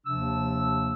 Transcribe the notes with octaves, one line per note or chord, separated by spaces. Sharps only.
D#2 C3 F3 D4 E6